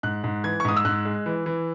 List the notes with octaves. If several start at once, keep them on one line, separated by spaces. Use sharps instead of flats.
G#2 F#6
G#2
E3 G#6
C#6
G#2 D#6
E6
G#2 F#6
G#3
E3
E3